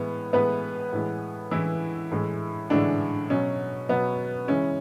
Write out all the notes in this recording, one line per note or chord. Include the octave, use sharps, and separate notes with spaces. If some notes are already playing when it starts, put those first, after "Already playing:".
Already playing: A2 E3 G#3 B3
A2 E3 G#3 B3 B4
A2 E3 G#3
A2 E3 G#3 E4
A2 E3 G#3
A2 D3 E3 G#3 D4
B2 F#3 C#4
B2 F#3 B3
C#3 E3 G#3 C#4